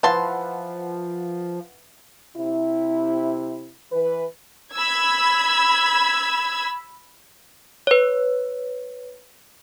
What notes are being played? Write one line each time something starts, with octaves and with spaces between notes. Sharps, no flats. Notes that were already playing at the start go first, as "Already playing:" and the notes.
E3 F3 B4 F5 F#5 A5 C6
C3 E4
E3 B4
B5 E6 G#6
B4 C#5